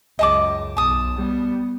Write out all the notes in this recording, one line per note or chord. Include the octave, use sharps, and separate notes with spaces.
C#2 F#2 D#5 A5 D6
B1 A5 D#6
G3 B3